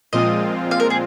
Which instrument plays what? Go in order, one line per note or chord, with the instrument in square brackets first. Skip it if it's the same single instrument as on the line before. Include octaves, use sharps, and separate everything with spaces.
[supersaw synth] A#2 F3 G#3 C4 F4 [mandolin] D#5
[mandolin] F5
A#4
G#4